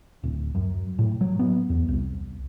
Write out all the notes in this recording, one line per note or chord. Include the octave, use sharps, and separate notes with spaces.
D1
F#2
A2
F#3
B3
E2
C2